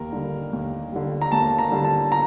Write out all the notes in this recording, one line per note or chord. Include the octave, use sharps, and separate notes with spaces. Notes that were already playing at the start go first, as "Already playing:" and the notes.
Already playing: D#2 A#4
D3 G3
D#2
D3 G3
A#5
D#2 A5
A#5
D3 G3
A5
A#5